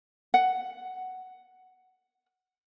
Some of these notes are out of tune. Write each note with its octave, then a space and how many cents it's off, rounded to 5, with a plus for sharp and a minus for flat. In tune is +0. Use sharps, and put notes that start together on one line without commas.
F#5 +5